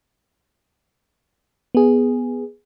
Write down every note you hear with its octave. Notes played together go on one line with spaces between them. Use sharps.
B3 G#4